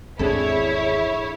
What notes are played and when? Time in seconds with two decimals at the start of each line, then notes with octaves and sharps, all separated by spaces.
0.19 G#1 E2 C4 D4 E4 G#4 A4 C#5